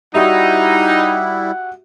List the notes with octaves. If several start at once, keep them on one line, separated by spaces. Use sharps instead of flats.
G3 D#4 E4 F#4 G4 E5 F#5